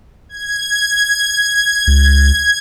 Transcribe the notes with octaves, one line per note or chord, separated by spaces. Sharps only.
G#6
C#2